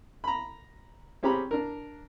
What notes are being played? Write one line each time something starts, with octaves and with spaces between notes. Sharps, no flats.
A#5 B5
C4 C#4 G4 G#4 A#5 B5
D4 A#4